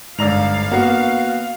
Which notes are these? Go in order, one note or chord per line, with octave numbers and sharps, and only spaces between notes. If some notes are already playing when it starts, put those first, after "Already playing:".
G1 G#2 D5 F5 A#5 E6 F7
A#3 B3 F#4